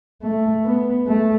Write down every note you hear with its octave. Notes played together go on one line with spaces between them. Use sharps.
A3
B3
A3